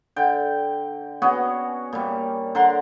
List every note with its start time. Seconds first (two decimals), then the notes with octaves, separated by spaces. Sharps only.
0.16 D3 G5
1.22 B3 C#4 F#4 G#4
1.93 A#2 G3
2.55 D3 A#4 F#5 C6